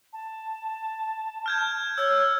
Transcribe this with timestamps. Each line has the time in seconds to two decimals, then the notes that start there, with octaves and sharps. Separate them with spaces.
0.13 A5
1.46 F6 G6 G#6
1.98 C#5 E6 G#6